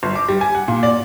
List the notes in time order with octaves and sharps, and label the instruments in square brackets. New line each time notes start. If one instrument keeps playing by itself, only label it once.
[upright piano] G1
D6
G3
G#5
F#5
A#2
D5